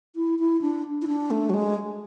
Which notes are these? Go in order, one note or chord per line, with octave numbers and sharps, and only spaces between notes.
E4
E4
D4
E4
D4
A3
F#3
G#3